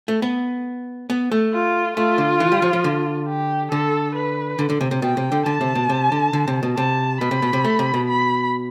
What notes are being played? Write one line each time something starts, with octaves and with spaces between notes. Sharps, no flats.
A3
B3
B3
A3
F4
A3 F4
D3
E3
G3
F3
F3
D3
G4
D3 A4
B4
D3
D3
C3
C3
B2 G5
C3
D3
D3 A5
C3
B2
C3
D3
D3
C3
B2
C3 A5
B2 B5
C3
B2
C3
A3
C3
B2
B5